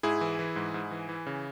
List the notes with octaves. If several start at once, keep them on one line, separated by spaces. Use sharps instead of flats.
G#2 E4 G#4
E3
E3
G#2
G#2
E3
E3
C#3